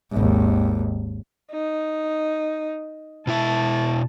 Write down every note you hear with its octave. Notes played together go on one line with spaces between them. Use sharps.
G#1 D#2
D#4
B2 E4 E5 A5